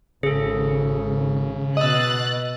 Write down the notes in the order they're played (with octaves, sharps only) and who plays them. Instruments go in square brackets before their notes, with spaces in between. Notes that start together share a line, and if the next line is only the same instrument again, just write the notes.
[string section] G#1 [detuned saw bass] C#3 [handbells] G#4 A4
[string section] B2 F#6 A6 [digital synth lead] D#5 [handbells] D#6 E6